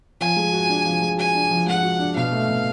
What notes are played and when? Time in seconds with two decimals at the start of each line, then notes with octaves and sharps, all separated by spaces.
0.20 F3 G#5
0.37 G#3
0.53 F#4
0.69 D4
0.85 F3
1.02 G#3
1.18 F#4 G#5
1.35 D4
1.51 F3
1.67 G#3 F#5
1.83 F#4
1.99 D4
2.15 B2 F5
2.32 A3
2.49 B2